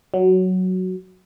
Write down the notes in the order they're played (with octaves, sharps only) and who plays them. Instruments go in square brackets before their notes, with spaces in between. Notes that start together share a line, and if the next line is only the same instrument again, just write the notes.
[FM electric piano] F#3